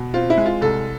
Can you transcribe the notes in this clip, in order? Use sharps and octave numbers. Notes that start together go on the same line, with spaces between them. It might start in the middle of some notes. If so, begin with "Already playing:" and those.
Already playing: B2
C4 F4
E4
G#3
F4
C2 A4